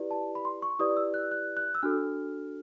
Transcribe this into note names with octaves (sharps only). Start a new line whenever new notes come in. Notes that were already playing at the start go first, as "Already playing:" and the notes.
Already playing: E4 G4 B4 D5
A5
B5
C6
C#6
E4 G4 B4 D5 D#6
E6
F#6
F#6
F#6
E6
D4 F#4 A4 F6